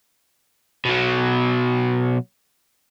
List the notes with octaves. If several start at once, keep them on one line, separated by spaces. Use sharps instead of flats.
B2 F#3